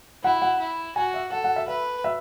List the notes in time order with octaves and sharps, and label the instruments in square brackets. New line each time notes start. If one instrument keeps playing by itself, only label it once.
[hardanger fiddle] E4 [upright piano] F#5
[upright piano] F#5
[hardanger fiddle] E4
[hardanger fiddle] F#4 [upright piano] G#5
[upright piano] E5
[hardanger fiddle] A4 [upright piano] F#5
[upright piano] F#5
E5
[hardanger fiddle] B4 [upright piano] E5
[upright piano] E5